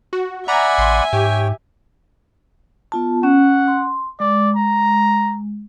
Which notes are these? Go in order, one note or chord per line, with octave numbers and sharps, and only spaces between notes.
F#4
D5 E5 F#5 G#5 A#5 B5
A1 C6
G#2 G4 C#5 G5
B3 F4 A5
C#4 F#5
C6
G#3 D5
A#5